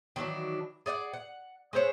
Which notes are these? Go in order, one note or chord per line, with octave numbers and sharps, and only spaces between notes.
D#3 E3 F#3 D4
G#4 D5 F5 F#5
F#5
G#3 E4 C5 C#5